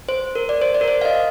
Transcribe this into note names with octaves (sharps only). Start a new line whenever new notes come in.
C5
A#4
D5
C5
D5
A#4
C5
F5
D#5